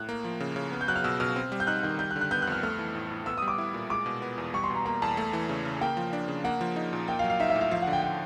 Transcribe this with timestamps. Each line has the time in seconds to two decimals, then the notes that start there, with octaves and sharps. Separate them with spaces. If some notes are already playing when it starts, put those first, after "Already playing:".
Already playing: A2 F#6
0.09 A#3
0.25 F3
0.40 C#3
0.56 C#3
0.72 B3
0.81 G6
0.88 F#3 F#6
0.96 F6
1.04 B2 E6
1.20 B2 F6
1.36 C4
1.52 G3
1.60 G6
1.67 D#4 F#6
1.83 D#3 G6
1.99 G3 G6
2.11 F#6
2.16 D3
2.21 F#6
2.31 B3 G6
2.42 F#6
2.47 F2 F6
2.63 A3 F6
2.79 E3
2.95 A2
3.11 A2
3.26 B3 E6
3.37 G3 D#6
3.48 D6
3.58 E4
3.74 A#2
3.90 G#3 D6
4.06 B2
4.22 B3
4.38 E2
4.54 G3 C#6
4.64 C6
4.70 B2
4.75 A#5
4.85 A#3 A#5
5.02 E2 A5
5.17 A3
5.33 E3
5.49 C#3
5.65 C#3
5.81 A#3 G5
5.97 F3
6.13 D4
6.28 C#3
6.44 A#3 F#5
6.61 F3
6.76 D#4
6.93 A#2
7.08 A#3 G5
7.19 F5
7.24 F#3
7.30 F5
7.40 D#4 E5
7.50 E5
7.56 A2
7.61 F5
7.71 F3 F5
7.82 D3 F#5
7.93 G5
8.03 G5